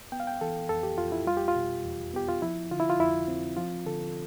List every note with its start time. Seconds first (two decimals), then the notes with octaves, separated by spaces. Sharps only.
0.12 B3 G5
0.20 F5
0.27 G5
0.41 E3 A4
0.69 F2 A4
0.83 G4
0.98 F2 F4
1.12 E4
1.26 G3 F4
1.37 G4
1.48 F4
1.56 B2
1.85 E2
2.13 B3 G4
2.28 F4
2.42 F3 E4
2.71 D3 F4
2.80 E4
2.90 F4
2.99 F2 E4
3.28 C4
3.57 F3 F4
3.85 D3 A4